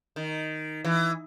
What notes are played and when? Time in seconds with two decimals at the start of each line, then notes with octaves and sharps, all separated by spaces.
0.16 D#3
0.85 E3